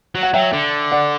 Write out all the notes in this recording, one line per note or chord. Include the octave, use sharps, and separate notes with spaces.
F#3
F#5
F#3 E5 G5
D3
D5 F#5